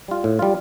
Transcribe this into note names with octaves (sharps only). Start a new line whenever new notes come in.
G3 F4
A2
G3 F4